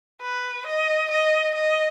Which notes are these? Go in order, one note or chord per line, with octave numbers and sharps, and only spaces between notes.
B4
D#5
D#5
D#5